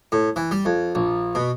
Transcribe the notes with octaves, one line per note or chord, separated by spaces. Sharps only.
A2
E3
G3
F2
A#1
B2